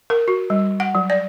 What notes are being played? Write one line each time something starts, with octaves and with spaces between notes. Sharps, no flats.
A#4
F#4
G3
F#5
F#3
D5